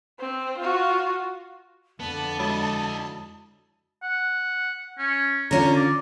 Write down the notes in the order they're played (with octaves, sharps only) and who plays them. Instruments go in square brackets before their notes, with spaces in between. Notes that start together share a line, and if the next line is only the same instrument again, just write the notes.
[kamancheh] C4
F4 F#4
[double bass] F2 D3 [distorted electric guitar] B3 [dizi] A5
[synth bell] G#3 F#4 D#6 [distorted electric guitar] E4 D#5
[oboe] F#5
C#4
[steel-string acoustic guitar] D3 C#4 F4 [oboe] A#5
[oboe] D5